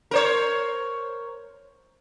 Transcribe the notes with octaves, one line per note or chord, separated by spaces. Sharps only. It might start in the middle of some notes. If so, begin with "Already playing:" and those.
A#4 C5 C#5